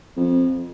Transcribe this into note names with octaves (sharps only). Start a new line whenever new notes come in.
F2